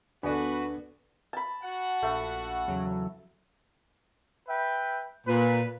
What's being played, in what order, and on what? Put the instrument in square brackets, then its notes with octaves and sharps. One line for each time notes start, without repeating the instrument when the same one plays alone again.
[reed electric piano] D2 D4 [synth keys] B3 [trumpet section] F#4 B4 [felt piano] A4 D5 G#5
[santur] A5 B5
[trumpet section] F#4 F#5
[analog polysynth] A#1 [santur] A3
[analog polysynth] E2 C#3 F#3
[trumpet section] B4 E5 G5
[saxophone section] A#2 [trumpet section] B4